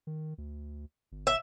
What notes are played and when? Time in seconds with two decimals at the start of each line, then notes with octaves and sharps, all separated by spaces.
0.07 D#3
0.38 D2
1.12 G1
1.27 E5